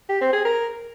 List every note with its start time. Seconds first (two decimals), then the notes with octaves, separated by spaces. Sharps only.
0.09 G4
0.21 C4
0.33 G#4
0.45 A#4